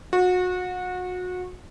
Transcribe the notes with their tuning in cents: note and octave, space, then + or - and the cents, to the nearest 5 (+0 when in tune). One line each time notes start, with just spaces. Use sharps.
F#4 -30